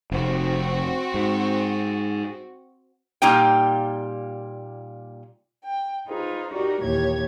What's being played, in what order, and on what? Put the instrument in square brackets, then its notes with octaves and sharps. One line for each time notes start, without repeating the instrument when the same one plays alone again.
[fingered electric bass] F1 [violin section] C4 F#4
[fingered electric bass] G#2
[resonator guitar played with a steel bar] A#2 G3 A#3 D#4 F4 G5
[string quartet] G5
D#4 F4 G#4 B4 C5
D#4 F#4 G4 A#4 D5
D#2 A#2 E3 G4 C#5 G#6